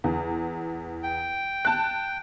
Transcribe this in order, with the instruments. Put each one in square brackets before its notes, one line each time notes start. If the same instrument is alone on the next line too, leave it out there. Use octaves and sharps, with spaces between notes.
[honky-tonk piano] E2
[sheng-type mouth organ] G5
[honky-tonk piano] A5 F#6